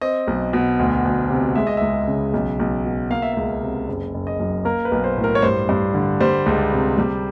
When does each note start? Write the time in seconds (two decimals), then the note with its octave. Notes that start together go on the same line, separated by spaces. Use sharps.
0.01 C4 D#5
0.27 B1
0.53 B2
0.79 D2
1.05 D2
1.30 C3
1.56 G#3 E5
1.67 D#5
1.77 C#2 E5
2.07 C#3
2.34 B1
2.59 B1
2.85 B2
3.10 A#3 F5
3.22 E5
3.33 C#2 F5
3.62 C3
3.88 F#1
4.14 F#1
4.27 D#5
4.40 F#2
4.65 A#3 A#4
4.85 B4
4.92 B1
5.04 C5
5.17 A2
5.24 A#4
5.35 C#5
5.42 G2 C5
5.69 G2
5.94 D3
6.21 G3 C5
6.46 C#2
6.72 C3
6.98 G3